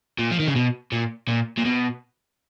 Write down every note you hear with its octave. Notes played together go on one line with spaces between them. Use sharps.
A#2
F3
D#3
C#3
B2
A#2
A#2
A#2
B2